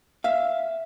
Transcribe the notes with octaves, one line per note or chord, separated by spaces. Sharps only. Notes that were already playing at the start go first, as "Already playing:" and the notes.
E5 F5